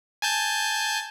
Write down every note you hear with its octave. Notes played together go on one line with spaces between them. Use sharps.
G#5 A5 G6